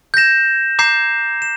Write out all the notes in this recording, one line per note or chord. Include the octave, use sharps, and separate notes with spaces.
G6 A#6 E7
A#5 D6 G6 C7 E7
E7